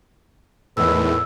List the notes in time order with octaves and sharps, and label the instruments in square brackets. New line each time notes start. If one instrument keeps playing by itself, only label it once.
[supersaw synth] E2 A2 [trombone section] D#3 G#3 B4 [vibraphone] E6